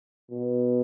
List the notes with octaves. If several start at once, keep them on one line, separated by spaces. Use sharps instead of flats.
B2